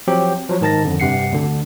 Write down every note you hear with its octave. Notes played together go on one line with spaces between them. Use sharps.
F3 F#3 C4 G4
F3 F#3
G#2 D#3 A5 A6 A#6
F2 D3
G2 C3 F#5 C7 C#7
D2 D3